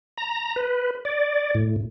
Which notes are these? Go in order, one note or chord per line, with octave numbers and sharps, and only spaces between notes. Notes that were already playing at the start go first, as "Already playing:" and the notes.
A#5
B4
D5
A2